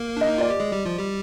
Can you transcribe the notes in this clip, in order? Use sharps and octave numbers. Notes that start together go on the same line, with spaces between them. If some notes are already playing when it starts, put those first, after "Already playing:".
Already playing: A#3 A#4
D4 D#5
D#4
F4 D5
G4
G#3 G#4
G3 G4
F3 F4
G3 G4